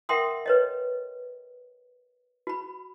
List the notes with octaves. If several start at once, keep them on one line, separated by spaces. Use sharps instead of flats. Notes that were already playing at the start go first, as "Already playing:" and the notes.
A#4 E5 F#5 G5 C6 D#6
B4 C#5 D#5
F#4 B5